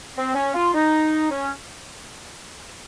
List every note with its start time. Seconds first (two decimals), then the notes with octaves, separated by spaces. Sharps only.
0.16 C4
0.35 C#4
0.54 F4
0.74 D#4
1.30 C#4